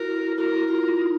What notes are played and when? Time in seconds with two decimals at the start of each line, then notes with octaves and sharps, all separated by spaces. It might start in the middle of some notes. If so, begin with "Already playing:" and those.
Already playing: E4 F#4 A#4
0.38 E4 F#4 A#4
0.69 F4 A#4
1.01 D#4